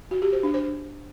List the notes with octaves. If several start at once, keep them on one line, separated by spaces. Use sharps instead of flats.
F#4
G4
C5
D4
C5